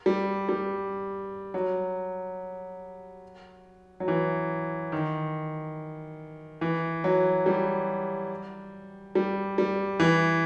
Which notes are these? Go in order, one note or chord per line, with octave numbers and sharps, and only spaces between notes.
G3
G3
F#3
F#3
E3
D#3
E3
F#3
G3
G3
G3
E3